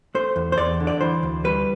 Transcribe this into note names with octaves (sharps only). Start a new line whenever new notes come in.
A3 C5
E2
C5
E2 D5
D3
D5
E3 C5
D2
G3 B4